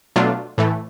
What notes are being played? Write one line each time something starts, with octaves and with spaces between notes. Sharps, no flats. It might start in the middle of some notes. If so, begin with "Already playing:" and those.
B2 F#3 A3 D4 F4
A2 E3 A3